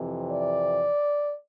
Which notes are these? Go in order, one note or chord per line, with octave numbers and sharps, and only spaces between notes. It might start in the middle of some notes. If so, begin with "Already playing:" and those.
Already playing: F2 C3 E3
D5